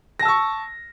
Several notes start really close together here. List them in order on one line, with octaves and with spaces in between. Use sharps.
A#6 A5 E6 C#6